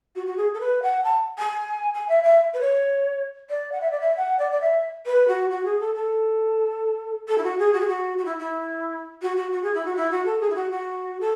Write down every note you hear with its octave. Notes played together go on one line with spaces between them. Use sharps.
F#4
F#4
G#4
A4
B4
F#5
A5
G#5
G#5
E5
E5
B4
C#5
D5
F#5
E5
D5
E5
F#5
D5
D5
E5
B4
F#4
F#4
G#4
A4
A4
A4
E4
F#4
G#4
F#4
G#4
F#4
F#4
E4
E4
F#4
F#4
F#4
G#4
E4
F#4
E4
F#4
A4
G#4
E4
F#4
F#4
A4